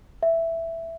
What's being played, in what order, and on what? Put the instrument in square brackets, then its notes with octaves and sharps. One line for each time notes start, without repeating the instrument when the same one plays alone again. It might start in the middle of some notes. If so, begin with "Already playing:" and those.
[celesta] E5